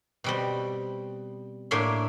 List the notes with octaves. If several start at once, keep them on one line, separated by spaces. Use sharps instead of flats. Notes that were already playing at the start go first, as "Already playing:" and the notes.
B2 G3 C4
A2 A#3 D4 C#5 E5 C6